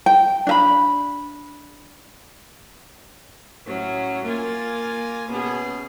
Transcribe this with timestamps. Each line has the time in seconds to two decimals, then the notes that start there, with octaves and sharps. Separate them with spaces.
0.06 G5
0.47 D4 E5 B5
3.67 A2 F#3 C#4
4.25 A#3 F4 G#5 A6
5.28 B2 C#4 G#4